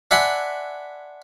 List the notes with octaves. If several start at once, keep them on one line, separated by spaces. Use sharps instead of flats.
D4 E5 F#5 G#5 B5 C6